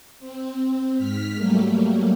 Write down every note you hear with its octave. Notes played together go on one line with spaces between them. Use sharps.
C4
G#2 F6 B6
F#3 G3 A3 A#3